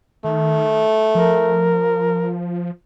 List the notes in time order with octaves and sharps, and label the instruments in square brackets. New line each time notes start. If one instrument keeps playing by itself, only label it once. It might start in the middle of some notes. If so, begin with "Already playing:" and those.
[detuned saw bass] D#3 [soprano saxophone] A3
[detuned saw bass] F3 [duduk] A#4